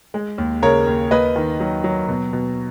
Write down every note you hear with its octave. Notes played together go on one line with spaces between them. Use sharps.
G#3
D#2
C#3 A#4 C#5
D#2
A#3 B4 D#5
D#3
F#3
F#3
B2
B2